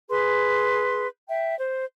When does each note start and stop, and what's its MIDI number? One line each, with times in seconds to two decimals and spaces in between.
0.09 1.07 68
0.09 1.07 71
0.09 1.07 84
1.28 1.56 76
1.28 1.56 79
1.57 1.84 72